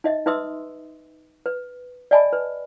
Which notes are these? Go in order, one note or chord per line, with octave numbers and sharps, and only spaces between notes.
D#4 D#5 E5
D#4 B4 E5 C6 D#6 E6
B4
D5 D#5 G#5 A5 B5
B4